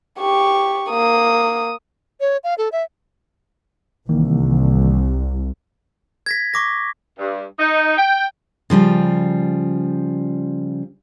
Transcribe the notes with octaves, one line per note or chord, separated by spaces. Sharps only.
G4 C#6
A#3 D#6
C#5
F5
A4
E5
C2 D#3 E3 A#3
G#6 A#6 B6
C#6 D6 A#6
G2
D#4
G5
C#3 F3 G3 F4